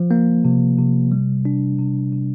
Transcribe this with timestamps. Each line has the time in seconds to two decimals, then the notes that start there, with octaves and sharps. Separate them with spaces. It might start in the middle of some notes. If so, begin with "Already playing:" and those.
Already playing: F3
0.11 A#3
0.45 C3
0.78 C3
1.12 G3
1.45 D4
1.79 C3
2.12 C3